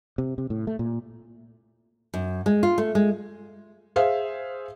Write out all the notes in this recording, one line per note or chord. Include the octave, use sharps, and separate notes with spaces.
C3
C3
A2
A3
A#2
F#2
G#3
F4
A3
G#3
G#4 C5 E5 F5